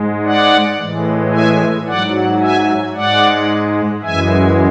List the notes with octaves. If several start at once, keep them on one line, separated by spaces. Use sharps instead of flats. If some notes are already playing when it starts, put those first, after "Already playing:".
Already playing: G#2 G#3
D5 F#5
A2 E3 G#3
E5 G#5
G#2 F#3 D5 F#5
E5 G#5
G#2 G#3 D5 F#5
F#2 E3 G#3 E5 G#5